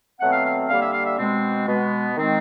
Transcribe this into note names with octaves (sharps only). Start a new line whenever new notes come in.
B2 F#3 A3 C4 F#5
F5
F5
D3 G3 A#3 F5
E5
F5
E5
B2 G#3 C4
B2 G#3 B3
D#3 G#3 C4